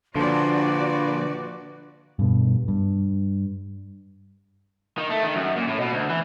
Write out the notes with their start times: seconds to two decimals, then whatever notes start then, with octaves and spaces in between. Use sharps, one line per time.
0.16 A#2 D3 F3 F#4 B4 D5
2.19 G2 B2
2.68 G2
4.98 D#3
5.10 A3
5.23 D#3
5.35 F#2
5.56 A#2
5.67 A2
5.80 B2
5.92 D2
6.09 E3